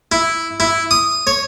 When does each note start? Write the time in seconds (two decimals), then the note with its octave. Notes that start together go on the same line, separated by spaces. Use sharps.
0.12 E4
0.60 E4
0.91 D#6
1.27 C#5